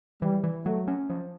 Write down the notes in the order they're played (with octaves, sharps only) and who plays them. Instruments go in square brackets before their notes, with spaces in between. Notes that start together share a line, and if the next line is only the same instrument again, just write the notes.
[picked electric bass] E3 [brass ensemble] G3
[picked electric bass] E3
[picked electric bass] F#3 [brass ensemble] A3
[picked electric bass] C#4
F3